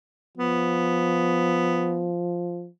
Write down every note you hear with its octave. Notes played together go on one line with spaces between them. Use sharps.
F3 B3